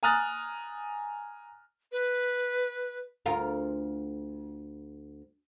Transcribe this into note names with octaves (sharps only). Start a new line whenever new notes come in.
G#5 A#5 D#6 F6 F#6 A6
B4
D2 F4 A#4